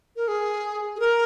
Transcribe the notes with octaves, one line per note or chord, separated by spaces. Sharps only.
A#4
G#4
G#4
A#4